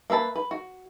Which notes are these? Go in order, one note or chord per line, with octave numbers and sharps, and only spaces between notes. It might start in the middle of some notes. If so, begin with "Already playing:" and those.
A#3 B4 E5 A5 B5
B4
F#4